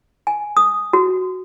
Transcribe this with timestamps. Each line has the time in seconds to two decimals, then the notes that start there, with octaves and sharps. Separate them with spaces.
0.27 G#5
0.57 D#6
0.93 F#4